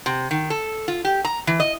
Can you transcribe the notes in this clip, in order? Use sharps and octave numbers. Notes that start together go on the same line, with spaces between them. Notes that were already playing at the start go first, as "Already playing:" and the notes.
C3
D#3
A4
F4
G4
A#5
E3
D#5